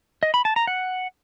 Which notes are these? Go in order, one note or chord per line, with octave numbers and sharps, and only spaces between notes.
D#5
B5
A5
A#5
F#5